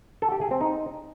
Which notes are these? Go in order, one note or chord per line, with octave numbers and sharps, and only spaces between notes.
A4
G4
G#4
C4
D#4